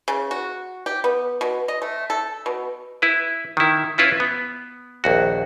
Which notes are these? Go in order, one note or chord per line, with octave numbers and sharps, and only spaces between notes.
C#3
F#4
G4
B3
B2
D#5
A3
A4
B2
E4 B4
D#3 E4
C#4 E4 F4 B4
B3
A#1 D#2 F#4